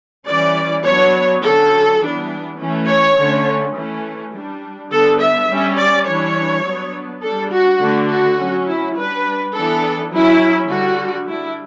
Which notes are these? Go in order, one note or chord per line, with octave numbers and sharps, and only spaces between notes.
E3 G3 C#4 D5
F#3 B3 D4 C#5
D3 F#3 C#4 A4
E3 G3 B3 D4
E3 A3 C#4
C#5
D3 A3 C#4
E3 A3 C#4
G3 D4
D3 G3 B3 D4 A4
E5
G3 C#4
D5
E3 G3 D4 C#5
F#3 B3 D4
G3 D4 A4
F#4
D3 A3 D4
F#4
F#3 C#4
E4
G3 D4 B4
E3 B3 D4 A4
F#3 C#4 E4
D3 G3 D4 F#4
G3 D4 E4